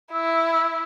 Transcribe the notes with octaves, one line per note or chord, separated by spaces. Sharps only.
E4 E6